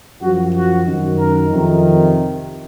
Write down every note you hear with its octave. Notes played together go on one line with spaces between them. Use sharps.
F#2 F3 F#4
F#4
F#2 D#3
A#4
F2 C3 D#3